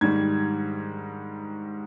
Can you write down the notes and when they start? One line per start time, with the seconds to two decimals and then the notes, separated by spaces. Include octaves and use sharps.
0.01 G#2 D#3 G3 G#6